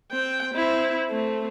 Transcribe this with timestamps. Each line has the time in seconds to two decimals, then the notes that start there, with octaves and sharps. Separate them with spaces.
0.12 C4 G5
0.53 C4 E4
1.10 A3 C4